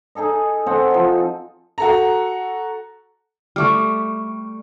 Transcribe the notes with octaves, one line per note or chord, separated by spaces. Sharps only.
D#4 G#4 A4 D#5
C4 A4 D#5 F#5
F3 D#4
F#4 A4 A#5
G3 A3 C#6 D6 F6